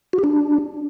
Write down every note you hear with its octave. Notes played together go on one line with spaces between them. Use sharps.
F#4
G4
D4